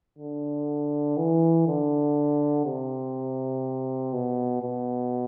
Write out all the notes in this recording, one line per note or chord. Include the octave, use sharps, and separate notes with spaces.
D3
E3
D3
C3
B2
B2